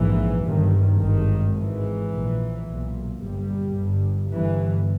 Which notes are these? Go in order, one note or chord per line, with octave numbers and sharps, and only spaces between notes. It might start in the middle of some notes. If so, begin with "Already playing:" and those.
Already playing: A#1 G#2 E3
G1 G2 D#3
G#1 G2 D#3
G#1 G#2 E3
A#1 A#2
B1 A#2
G1 G2 G3
G1 G2
G1 G2 E3